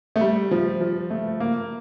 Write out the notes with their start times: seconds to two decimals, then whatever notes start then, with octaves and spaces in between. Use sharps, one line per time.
0.16 A3
0.21 G3
0.51 F3
0.81 F3
1.10 A3
1.40 A#3